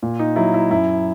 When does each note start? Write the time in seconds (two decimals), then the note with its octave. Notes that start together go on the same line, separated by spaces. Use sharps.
0.03 A#2
0.19 D#4
0.36 F#3 E4
0.54 E4
0.71 F#2 E4